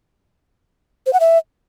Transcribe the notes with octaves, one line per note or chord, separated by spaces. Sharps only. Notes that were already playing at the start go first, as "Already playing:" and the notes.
C5
F#5
E5